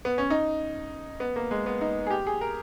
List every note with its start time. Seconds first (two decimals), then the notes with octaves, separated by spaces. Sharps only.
0.05 B3
0.18 C#4
0.30 D#4
1.20 B3
1.36 A#3
1.51 G#3
1.66 B3
1.81 D#4
2.07 G#4
2.10 G4
2.27 G#4
2.41 A#4